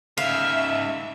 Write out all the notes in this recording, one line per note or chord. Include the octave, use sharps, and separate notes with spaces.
G#2 C#3 E5 F5